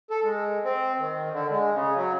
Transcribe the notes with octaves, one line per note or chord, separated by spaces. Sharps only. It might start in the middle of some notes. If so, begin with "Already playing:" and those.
A4
G#3
C4
D#3
D3
G#3
C#3
F#3